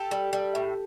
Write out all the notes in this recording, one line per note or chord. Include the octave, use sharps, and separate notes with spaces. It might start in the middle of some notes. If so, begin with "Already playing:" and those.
Already playing: G4 A4
G3
G3
A2